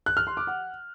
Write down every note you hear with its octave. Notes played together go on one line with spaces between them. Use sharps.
F#6
F6
C6
D6
F#5